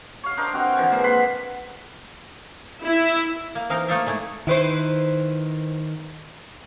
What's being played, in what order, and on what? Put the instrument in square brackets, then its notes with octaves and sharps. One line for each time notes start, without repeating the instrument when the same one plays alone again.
[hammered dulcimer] C#5 F5
D4 A#4 C5 D#5
C4 F#4 D#5 C6
D3 E3 F3 G#5
G#3 A#3
F#5 B5 C6
[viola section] E4
[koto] A#3
E3 C4 D#4 A#4 F5
A3 A#3 D#4 A4 C5 E5
G#3 A3 E4
[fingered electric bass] D#3 [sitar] E4 B4 C5